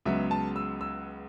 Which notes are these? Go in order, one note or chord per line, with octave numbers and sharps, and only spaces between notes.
C#2 C#3 F#3 B3 E5
A5
E6
E6